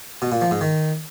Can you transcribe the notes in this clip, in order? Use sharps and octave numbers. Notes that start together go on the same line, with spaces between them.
B2
A#2
F3
G#2
D#3